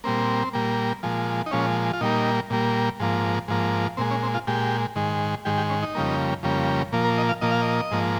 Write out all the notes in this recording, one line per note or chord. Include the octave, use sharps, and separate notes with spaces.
A#2 G3 A#3 C4
A#2 G3 A#3
A#2 F3 G#3
D#4
A#2 F3 G#3 C#4
F4
A#2 G3 A#3 D#4
A#2 G3 A#3
G#2 F3 A#3
G#2 F3 A#3
A#2 G#3 C4
C#4
C4
F4
A#2 G#3 G4
G#2 D#3 G#3
G#2 D#3 G#3 G4
G4
C#4
D#4
F2 C#3 G3 A#3
F2 C#3 G3 A#3
A#2 F3 A#3
A#4
D#5
F5
A#2 F3 A#3 D#5
F5
D#5
G#2 F3 A#3